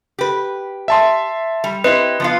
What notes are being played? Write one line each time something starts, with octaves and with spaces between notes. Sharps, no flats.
G4 B4
E5 A5 C6
G3
C4 E4 G4 B4 D#5
F3 B3 F4